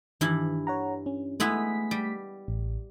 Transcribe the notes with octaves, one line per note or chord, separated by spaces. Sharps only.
G2 D#3 E3 E4
C#5 F#5 A#5
C#4
G#3 A3 B3 E4 B6
G3
A1